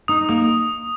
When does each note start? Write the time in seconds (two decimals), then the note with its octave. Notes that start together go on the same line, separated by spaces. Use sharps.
0.08 D#4 D#6
0.29 A#3 D#6